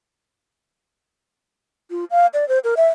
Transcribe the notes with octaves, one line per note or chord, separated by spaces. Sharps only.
F4
F5
D5
C5
A#4
E5